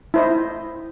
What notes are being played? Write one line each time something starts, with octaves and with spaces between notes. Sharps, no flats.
E4 C5 D#5